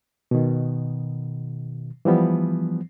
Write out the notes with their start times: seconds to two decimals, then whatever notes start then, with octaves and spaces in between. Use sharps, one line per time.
0.31 B2 D#3
2.05 E3 F3 G3 B3